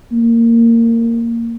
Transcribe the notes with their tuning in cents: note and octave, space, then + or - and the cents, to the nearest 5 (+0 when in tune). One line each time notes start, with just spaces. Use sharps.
A#3 -15